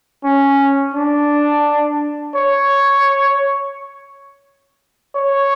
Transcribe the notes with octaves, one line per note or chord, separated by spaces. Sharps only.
C#4
D4
C#5
C#5